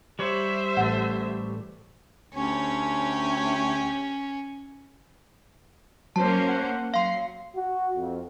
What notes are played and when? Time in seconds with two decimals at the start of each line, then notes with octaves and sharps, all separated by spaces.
0.19 G3 C5 C#5 E5
0.77 A1 A3 F#5
2.35 D2 C#4 G4 C#5
6.16 F#3 A#3 C#4 C5 A5
6.48 F#5
6.94 F#3 F5 C6 C7
7.56 F#4
7.95 F2